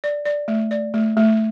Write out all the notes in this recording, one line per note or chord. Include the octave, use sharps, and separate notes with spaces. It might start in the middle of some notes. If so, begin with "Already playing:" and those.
D5
D5
A3
D5
A3
A3